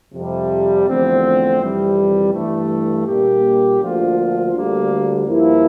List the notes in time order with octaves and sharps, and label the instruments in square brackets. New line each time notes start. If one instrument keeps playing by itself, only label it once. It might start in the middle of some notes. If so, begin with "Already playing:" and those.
[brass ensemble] F2 C3 G3
E2 D3 F3 A3 C4
F2 C3 E3 G3
G2 E3 A3
A#2 G3 A#3 D4 G4
D2 D3 F3 A#3 F4
D2 D3 G3 A#3
G2 F3 A#3 E4